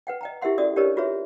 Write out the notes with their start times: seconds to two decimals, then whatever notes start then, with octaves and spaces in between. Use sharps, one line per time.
0.07 B4 F#5 G5
0.21 D#5 G5 A#5
0.41 E4 G4 A#4 E5 F#5 C6
0.58 C#4 F#4 A4 D5 D#6
0.76 D4 G4 A#4 B4 C#5 D#5
0.97 F4 F#4 G#4 B4 C#5 E5